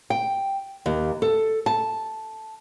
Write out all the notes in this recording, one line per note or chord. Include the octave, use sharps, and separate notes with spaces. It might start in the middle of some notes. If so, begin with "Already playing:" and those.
G5
D#2
A4
A5